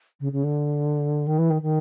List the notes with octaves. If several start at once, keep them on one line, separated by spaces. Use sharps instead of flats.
C#3
C#3
D3
D#3
E3
D#3
D#3